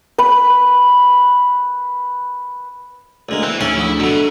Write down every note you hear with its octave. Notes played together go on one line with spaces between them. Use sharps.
B4 B5
D2 G#3 A#3 D4 D5
E3 C4 G5
D2 C#4 D#4 G#4 C#5 D5 E5
F3 E4 F#5 D#6
B2 F#3 A3 D4 A4